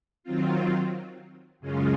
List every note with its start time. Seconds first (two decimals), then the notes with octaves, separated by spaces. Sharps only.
0.23 D#3 F#3 C4 F4
1.60 F#2 C#3 G#3 C#4 F4